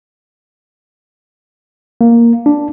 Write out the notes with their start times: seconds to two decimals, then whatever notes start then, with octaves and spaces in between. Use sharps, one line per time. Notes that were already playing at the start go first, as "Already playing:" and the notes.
2.01 A#3
2.46 D4